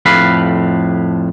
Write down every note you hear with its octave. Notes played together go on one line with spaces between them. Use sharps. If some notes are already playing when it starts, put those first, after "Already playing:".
F2 A2 B4 F5 B5